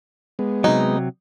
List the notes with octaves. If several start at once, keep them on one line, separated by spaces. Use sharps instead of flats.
G#3 B3
C3 F#3 D#4